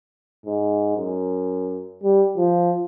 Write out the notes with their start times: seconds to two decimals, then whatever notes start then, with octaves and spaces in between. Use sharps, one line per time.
0.46 G#2
0.97 F#2
2.03 G3
2.37 F3